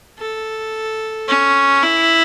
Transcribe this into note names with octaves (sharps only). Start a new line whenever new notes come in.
A4
C#4
E4